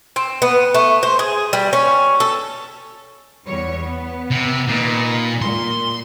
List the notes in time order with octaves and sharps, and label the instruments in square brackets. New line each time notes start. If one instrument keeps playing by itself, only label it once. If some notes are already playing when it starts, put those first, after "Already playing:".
[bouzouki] C4
B3
A3
C5
G#4
G3
C#4
A4
[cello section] E2 G3 C#5
B3
[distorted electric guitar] C3
[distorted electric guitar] A#2 [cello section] D#3 B4 D#5
[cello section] A#2 [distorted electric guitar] C6